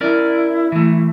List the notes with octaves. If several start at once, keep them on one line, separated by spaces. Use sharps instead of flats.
C#4 E4 A#4 D5
E3 A3